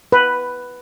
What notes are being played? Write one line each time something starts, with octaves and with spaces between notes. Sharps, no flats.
B4